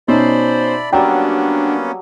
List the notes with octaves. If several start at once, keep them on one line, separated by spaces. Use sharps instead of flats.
B2 C#4 D#4 C5 D5 E5 A5 B5
F#3 G3 A#3 B3 C#4 D4 G5